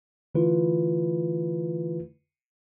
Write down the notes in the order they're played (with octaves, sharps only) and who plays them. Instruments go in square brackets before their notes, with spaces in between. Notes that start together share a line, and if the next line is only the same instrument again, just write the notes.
[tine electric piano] D3 E3 A3 E4 F4 B4